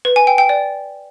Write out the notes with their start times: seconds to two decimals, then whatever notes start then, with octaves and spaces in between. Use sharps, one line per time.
0.05 B4
0.16 G#5
0.27 G5
0.38 G5
0.49 D5